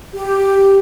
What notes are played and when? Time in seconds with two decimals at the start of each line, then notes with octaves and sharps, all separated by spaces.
0.14 G4